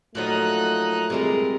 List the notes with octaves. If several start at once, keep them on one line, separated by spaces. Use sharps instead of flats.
A#2 F3 F#3 A3 D#4 F#6
C3 G3 G#3 A#4